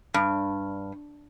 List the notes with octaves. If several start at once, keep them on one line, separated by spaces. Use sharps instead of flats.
G2